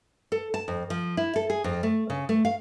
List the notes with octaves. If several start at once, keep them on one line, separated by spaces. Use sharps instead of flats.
A4
A5
F2
F3
E4
A4
G#4
F2
A3
C#3
A3
F5